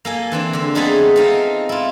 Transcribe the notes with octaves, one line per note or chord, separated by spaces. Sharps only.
A#3 A4 G#5
E3 C4 D4
D3 C4
A3 B3 C4 D#4 G#4 A4
C4 D#4 F4
E4 F4